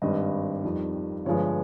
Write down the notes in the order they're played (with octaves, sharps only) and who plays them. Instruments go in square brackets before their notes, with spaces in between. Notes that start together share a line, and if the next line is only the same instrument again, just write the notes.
[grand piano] G#1 G2 G3 D#5
F2 D#3 G3
G1 G2 F3 G#3 C#5